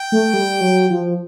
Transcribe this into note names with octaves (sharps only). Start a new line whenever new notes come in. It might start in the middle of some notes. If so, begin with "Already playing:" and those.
Already playing: G5
A3
G3
F#3
F3